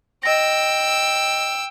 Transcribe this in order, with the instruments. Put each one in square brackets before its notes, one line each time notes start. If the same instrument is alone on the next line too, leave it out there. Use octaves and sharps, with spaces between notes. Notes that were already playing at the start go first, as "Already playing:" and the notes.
[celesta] D#5 A#6 [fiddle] G5 E6